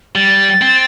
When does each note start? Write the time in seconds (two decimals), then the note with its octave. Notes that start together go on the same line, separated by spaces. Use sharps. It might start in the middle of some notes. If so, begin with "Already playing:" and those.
0.15 G3 A6
0.62 C4